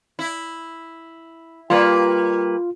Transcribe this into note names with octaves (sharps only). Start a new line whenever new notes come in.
E4
G3 A#3 F4 B4